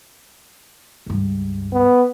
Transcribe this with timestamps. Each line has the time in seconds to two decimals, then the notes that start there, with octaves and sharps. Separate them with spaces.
1.06 C#2 G2
1.73 B3